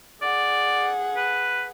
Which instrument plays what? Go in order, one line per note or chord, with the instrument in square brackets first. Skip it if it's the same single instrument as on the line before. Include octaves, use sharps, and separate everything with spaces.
[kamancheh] G#4 F#5 [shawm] D5
[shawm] B4